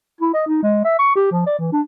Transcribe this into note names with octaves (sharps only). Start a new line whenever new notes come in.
E4
D#5
D#4
G#3
E5
C#6
G4
F3
D5
E3
D4